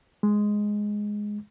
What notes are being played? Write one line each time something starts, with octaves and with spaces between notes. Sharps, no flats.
G#3